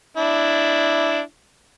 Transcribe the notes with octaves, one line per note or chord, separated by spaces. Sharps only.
D4 E4